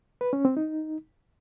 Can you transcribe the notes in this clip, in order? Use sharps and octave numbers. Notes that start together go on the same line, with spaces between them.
B4
C#4
C4
D#4